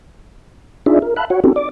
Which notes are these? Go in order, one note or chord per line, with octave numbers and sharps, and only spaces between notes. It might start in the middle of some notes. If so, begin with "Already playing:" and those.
D4 D#4 F4 G#4 D5 E5
A#4
E5 F5 A5 B5 F#6
F#4 C#5 F#5
C4 C#4 D#4 F#4 G4 A4
D5 D6